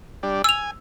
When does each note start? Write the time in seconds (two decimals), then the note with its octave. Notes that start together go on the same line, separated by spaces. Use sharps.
0.23 G3 D4
0.44 G#5 E6 F7